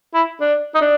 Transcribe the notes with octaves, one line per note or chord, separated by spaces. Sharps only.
E4
D4
D#4
D4